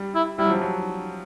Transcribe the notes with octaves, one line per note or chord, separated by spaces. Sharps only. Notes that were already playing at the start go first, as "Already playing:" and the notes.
Already playing: G3
E4
G3 E4
F#3
F3
F#3